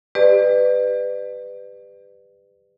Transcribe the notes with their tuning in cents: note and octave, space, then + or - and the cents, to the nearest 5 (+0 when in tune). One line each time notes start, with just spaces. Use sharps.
G4 +30 B4 +15 D5 +30